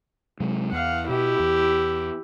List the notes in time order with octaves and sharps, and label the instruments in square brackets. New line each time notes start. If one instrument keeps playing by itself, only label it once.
[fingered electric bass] C3 F#3 G#3
[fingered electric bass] E2 [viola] F5 F#5
[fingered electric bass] B2 [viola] E4 G4
[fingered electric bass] E2